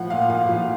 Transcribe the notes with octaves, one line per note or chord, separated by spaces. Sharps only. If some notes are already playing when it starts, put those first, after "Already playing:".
Already playing: A2 F3 F#5
A#2 F5
A#2 F5
F3